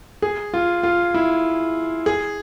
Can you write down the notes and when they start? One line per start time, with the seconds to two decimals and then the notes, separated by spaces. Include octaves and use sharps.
0.22 G#4
0.54 F4
0.83 F4
1.14 E4
2.06 G#4